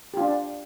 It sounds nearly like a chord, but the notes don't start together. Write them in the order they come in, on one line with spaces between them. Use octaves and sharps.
G4 F4 D4 D5